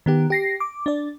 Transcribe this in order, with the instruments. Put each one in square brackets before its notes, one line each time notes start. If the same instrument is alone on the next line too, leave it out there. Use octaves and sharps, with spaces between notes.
[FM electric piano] D#3 B3 G4
G4 A#6 C7
D6
D4 D5